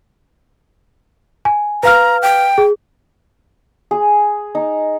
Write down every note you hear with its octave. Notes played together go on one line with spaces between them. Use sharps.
G#5
B4 F5 A#5 F6
G5
G#4
G#4
D#4